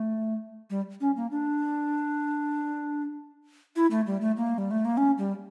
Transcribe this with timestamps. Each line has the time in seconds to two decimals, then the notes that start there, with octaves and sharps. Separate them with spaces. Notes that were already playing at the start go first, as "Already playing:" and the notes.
Already playing: A3
0.70 G3
1.01 C#4
1.16 A#3
1.31 D4
3.76 E4
3.91 A3
4.07 G3
4.21 A3
4.37 A#3
4.58 G3
4.71 A3
4.85 A#3
4.97 C#4
5.18 G3